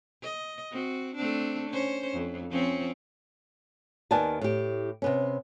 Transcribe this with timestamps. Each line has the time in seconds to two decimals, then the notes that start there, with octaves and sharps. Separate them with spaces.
0.23 D#5
0.71 C4 F#4
1.16 A3 C4 D4
1.70 C#4 C5
2.13 F2
2.51 F3 C4 C#4
4.11 D#2 D#3 B3 D5 G#5 A5
4.41 A2 G4
5.02 C3 B3 C#4